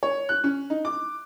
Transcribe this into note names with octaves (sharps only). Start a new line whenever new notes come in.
C#5
F#6
C#4
D#4
D6